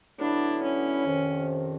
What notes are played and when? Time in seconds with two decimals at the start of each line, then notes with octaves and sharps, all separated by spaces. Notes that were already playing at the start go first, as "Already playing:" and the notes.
0.19 D3 F#3 B3 D4 E4
0.63 C#4
1.06 F2 C3 D#3